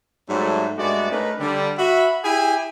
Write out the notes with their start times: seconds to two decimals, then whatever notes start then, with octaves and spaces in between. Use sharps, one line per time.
0.29 G#2 F#3 G3 A3
0.77 G2 G#3 A3 B3 F#4 D5
1.11 A3 C#4 D#4 A#4 B4
1.40 D3 G3
1.78 F#4 E5 B5
2.24 E4 G4 G#4 E5 G5 G#5